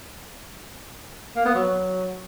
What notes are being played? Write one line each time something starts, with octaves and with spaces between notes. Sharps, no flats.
A#3
B3
F#3